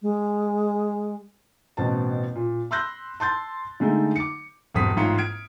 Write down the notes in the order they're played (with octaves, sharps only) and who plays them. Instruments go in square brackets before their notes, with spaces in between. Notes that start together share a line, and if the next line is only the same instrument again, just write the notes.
[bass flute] G#3
[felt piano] A1 B2 C4 A5
A#2
B5 C6 E6 F#6 G6 A#6
A5 C6 G6 A6
D3 G#3 A3 D#4
D6 C#7
[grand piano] E1 G2 C4 D#6 B6
A1 G#2 F4 C#7
F6 G#6 D7